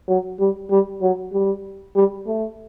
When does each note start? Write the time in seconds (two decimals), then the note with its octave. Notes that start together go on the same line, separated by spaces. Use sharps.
0.08 F#3
0.39 G3
0.70 G3
1.02 F#3
1.33 G3
1.95 G3
2.27 A3